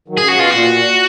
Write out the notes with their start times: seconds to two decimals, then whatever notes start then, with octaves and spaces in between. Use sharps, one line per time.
0.08 D#3 F#3
0.17 C#3 G#4
0.28 F#4
0.34 B2
0.39 F4
0.51 A#2 F#4